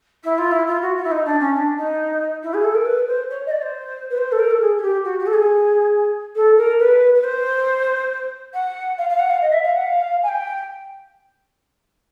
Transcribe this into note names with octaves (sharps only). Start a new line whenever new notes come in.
E4
F4
E4
F4
F#4
F4
E4
D#4
D4
C#4
D4
D#4
E4
G#4
A4
A#4
B4
C5
C#5
D#5
D5
C5
B4
C5
A4
A#4
A4
G#4
G#4
G4
F#4
G4
A4
G#4
A4
A#4
B4
B4
C5
F#5
F5
F5
F#5
F5
D#5
E5
F5
F#5
F5
G#5
G5